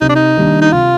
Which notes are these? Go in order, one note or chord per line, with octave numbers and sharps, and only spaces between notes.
C3 D#4
D4
D#4
D#3 G3 A#3 D4
D#4
C3 F4